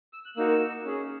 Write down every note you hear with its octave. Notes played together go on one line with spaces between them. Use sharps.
E6
F#6
A#3 D#4 F#4 E6
C#4 G#4